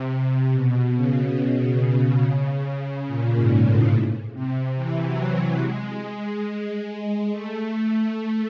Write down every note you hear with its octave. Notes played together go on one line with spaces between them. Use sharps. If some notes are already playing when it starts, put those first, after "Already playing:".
Already playing: C3
B2
C#3
C#3
A#2
G#2
A2
C3
E3
F#3
G#3
A3